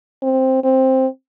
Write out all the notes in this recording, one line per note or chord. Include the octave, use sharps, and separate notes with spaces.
C4
C4